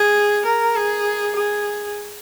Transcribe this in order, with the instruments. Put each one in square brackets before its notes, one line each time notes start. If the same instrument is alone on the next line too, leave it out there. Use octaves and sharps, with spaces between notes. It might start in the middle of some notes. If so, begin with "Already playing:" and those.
Already playing: [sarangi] G#4
A#4
G#4
G#4